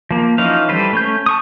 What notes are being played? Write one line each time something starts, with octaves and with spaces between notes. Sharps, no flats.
F3 A#3
E3 F3 C#4 D#4 F5
E3 G3 A4 B4 C5
A3 C#4 G6
A5 C#6 D#6